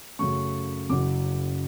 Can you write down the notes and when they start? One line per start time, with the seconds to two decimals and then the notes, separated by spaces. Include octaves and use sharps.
0.19 F#2 C#3 F#3 A3 C#6
0.89 F#1 F#2 C#3 F#3 D6